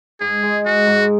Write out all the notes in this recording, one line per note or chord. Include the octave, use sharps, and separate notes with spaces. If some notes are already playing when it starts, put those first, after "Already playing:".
G#2 G#4
G#3
G#3 F#4
G#2